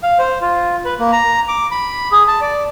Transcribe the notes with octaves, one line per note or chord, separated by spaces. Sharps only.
F5
C5
F4
B4
A#3
A#5
D6
B5
G#4
A5
D5